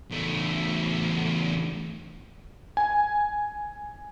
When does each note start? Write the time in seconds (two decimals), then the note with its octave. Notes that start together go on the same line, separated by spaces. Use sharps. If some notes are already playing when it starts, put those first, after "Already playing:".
0.10 E2 A3
2.77 G#5